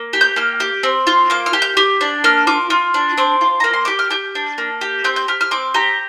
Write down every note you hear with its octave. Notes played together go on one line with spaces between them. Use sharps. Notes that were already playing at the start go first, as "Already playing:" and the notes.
Already playing: A#3
G4
G6
A#3 F6
G4
C4
F4
A#3 D6
F6
G4
G6
G4
D4
A#3 F6
F4 D6
F4
D4
C4 D6
F4
A#3 A#5
C6
G4 D6
F6
G4 G6
D4
A#3
G4
C4 G6
G6
G4 F6
F6
C4 D6
G4 A#5